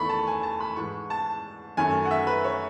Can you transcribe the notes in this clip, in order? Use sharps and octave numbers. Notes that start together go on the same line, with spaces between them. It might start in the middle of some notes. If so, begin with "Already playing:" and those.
Already playing: E2 D#3 A3 B5 C#6
A5
G#5
A5
B5
G#2 E3 G#3 C#6
A5
F#2 D#3 A3 G#5
F#5
E5
B4
C#5